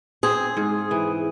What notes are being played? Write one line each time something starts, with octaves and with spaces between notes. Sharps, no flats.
C4 G#4
G#2
E3